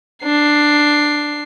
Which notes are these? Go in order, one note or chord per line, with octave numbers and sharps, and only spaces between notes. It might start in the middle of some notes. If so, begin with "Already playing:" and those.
D4 C7